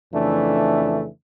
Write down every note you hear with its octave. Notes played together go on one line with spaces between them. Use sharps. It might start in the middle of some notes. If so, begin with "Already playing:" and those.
F2 C#3 E3 A3 D4